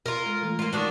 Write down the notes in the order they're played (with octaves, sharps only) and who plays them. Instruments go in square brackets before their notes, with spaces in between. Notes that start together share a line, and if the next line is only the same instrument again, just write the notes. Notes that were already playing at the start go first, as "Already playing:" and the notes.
[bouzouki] F4 A#4
[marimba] G#3 A4
E3 G#3 A3
[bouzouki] A#3 F4
D#3 D4 F#4